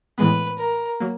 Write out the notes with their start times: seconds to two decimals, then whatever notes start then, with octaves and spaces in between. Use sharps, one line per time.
0.18 A2 E3 G#3 B3 B4
0.58 A#4
1.00 F#3 A#3